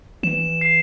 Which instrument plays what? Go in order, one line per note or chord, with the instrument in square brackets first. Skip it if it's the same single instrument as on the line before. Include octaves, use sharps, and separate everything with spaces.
[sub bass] E3 [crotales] E7
[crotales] C7